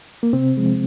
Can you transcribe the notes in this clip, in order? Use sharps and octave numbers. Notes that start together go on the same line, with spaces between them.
A#3
C3 C4
F3 G#3